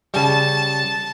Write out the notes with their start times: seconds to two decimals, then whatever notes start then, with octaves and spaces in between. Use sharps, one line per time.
0.14 C#3 G3 A5